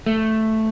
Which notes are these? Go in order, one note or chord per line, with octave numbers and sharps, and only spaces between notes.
A3